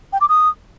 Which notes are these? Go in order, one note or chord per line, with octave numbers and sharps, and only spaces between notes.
G5
D6
D#6